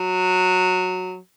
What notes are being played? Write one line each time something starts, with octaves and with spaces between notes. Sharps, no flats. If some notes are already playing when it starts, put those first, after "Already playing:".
Already playing: F#3